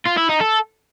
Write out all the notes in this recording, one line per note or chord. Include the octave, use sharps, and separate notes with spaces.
F4
E4
D#4
A4